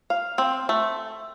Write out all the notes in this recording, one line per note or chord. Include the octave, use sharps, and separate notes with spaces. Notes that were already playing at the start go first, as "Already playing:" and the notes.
F5
C4
A3